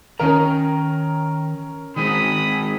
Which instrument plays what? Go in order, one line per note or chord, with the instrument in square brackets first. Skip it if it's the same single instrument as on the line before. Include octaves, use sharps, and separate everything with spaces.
[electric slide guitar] D#3 A#5 [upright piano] C#4 A#4
[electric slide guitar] D#3 G#3 C4 [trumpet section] B5 D#6